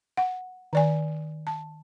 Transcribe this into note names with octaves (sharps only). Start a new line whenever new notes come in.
F#5
D#3 D5 G#5
A5